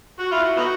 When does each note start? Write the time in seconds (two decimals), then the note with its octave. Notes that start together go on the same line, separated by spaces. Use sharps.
0.20 F#4
0.31 E4 F4
0.43 F#4
0.57 B3 D#4 F#4